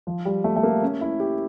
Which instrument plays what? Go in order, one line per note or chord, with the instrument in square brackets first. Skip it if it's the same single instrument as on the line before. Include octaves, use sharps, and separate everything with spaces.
[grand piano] F3
G3
A3
A3
A#3
C#4
E4
G4